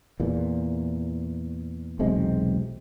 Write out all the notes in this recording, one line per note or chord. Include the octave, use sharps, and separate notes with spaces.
E2 A#2
E1 B1 C3 G#3